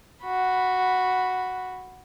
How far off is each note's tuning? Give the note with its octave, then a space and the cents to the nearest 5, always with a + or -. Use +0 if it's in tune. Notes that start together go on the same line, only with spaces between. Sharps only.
F#4 +0 B5 +0